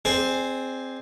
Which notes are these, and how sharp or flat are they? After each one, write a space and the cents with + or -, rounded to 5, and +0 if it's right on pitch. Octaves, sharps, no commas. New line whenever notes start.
C4 +0 G#4 +0 D5 +40